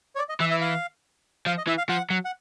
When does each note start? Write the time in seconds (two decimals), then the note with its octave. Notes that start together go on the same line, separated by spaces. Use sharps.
0.15 C#5
0.18 D5
0.29 D#5
0.40 E3 E5
0.51 E5
0.61 F5
1.46 F3 F5
1.58 D#5
1.67 E3 E5
1.78 F5
1.89 F3 F#5
2.10 F#3
2.25 F#5